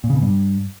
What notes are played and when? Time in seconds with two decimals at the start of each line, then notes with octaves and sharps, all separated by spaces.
0.04 A#2
0.10 C#3
0.16 B2
0.22 G2